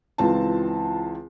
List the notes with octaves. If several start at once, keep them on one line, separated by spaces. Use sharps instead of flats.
C#2 E3 C4 F4 A5